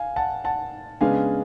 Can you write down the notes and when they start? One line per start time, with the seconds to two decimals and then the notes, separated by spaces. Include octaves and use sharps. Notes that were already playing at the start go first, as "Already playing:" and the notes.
Already playing: F5 G#5
0.16 F#5 A5
0.44 F#5 A5
1.01 C#3 G#3 B3 D4 F5 G#5